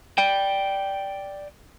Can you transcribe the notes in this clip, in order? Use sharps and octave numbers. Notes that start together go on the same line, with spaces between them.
D5 G5